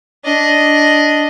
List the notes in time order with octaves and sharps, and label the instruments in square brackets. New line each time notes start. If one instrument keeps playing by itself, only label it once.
[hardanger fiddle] D4 D#5